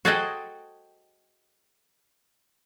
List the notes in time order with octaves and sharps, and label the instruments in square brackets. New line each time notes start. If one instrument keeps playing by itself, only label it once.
[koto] F#4 G#4 A4 C5 D#5 G5